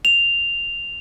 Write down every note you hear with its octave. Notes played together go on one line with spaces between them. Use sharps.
F7